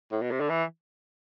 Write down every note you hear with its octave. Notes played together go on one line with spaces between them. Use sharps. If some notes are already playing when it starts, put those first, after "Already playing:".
A2
B2
C3
D3
E3